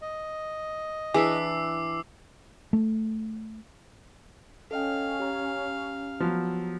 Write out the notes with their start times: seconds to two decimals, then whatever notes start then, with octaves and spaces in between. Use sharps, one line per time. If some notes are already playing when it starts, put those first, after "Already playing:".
0.02 D#5
1.14 E3 D4 G#4 E5 D6 E6 C7
2.73 A3
4.71 C#4 A4 D#5 F5 G5
5.20 G4 A#5
6.20 F3 F#3 B3